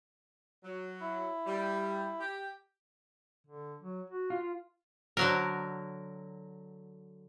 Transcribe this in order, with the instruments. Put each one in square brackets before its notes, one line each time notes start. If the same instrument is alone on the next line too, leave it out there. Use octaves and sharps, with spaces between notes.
[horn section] F#3
[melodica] E4
[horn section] G3
G4
[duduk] D3
F#3
F#4
[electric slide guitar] F4
[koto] D3 F#3 A#4